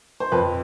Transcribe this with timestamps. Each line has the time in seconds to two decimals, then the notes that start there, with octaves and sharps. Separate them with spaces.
0.20 C5
0.32 F2 B4